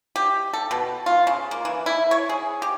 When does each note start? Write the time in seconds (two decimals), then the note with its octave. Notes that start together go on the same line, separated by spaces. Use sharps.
0.16 G4
0.53 A4
0.71 B2
1.06 F4
1.27 C#3
1.51 A#3
1.65 E3
1.86 E4
2.11 C#5
2.29 G#4
2.62 G4